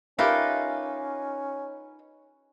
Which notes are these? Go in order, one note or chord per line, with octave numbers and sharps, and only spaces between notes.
C#4 D#4 F4 G4 A#4 B4 E5